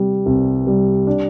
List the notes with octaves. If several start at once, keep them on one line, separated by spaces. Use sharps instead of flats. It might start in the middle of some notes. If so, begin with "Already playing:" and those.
Already playing: C3 G3
C2
G3
D4